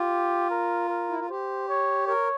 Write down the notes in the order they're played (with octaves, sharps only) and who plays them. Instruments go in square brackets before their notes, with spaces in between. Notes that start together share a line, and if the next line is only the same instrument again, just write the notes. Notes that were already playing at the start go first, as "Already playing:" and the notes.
Already playing: [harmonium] F4 [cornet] G4
[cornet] A#4
A#4
[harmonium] E4
F4
[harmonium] G4 [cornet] C5
[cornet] C#5
[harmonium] A#4 [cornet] C#5